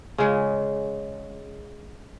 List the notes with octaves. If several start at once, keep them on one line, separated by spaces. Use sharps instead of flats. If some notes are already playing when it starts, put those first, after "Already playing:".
C#3 G#3